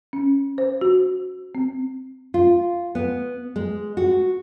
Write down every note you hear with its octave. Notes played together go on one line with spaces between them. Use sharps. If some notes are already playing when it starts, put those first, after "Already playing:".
C#4
C5
F#4
C4
F4
B3
G#3
F#4